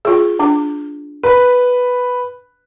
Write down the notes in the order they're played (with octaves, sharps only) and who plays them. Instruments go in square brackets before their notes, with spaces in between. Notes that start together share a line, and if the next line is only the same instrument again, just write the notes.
[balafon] F4 G#4
D4 D6
[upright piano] B4